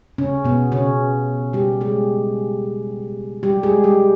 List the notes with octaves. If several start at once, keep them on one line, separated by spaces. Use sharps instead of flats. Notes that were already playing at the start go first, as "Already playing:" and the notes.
C#3 C#4
B2 B3
C#3 C#4
G3 G4
G#3 G#4
G3 G4
G#3 G#4
G3 G4